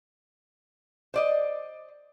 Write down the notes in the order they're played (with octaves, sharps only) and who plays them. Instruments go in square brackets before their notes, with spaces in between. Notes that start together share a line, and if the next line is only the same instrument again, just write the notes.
[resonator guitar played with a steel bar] C5 D5 D#5